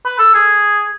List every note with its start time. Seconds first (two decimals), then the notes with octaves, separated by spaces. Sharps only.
0.05 B4
0.19 A4
0.35 G#4